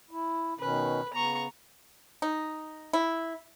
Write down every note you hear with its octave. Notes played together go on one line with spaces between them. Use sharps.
E4
B2 D#3 C#4 B4
C#3 B3 A#5 C#6
D#4
E4